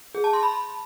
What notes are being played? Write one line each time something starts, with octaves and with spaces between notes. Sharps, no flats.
G#4
A5
C6
B5